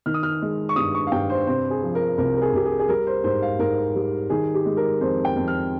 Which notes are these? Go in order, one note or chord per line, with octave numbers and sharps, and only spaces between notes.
D#3 F6
D#6
F6
G#3
C#6
G2 D#6
C#6
F5
G2 G5
C5
C3 C5
G#4
F3
A#4
C2 A#4
A#4
G#4
C2 G4
G#4
G#4
G3 A#4
C5
G#2 C5
F5
G#2 A#4
G3
D#3 G#4
G4
G#3
A#4
F2 C5
G5
F2
F6